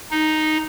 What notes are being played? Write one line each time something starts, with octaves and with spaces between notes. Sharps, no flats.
D#4